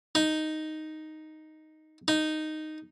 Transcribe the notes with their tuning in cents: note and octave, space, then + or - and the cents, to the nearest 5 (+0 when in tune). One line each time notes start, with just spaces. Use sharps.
D#4 +0
D#4 -5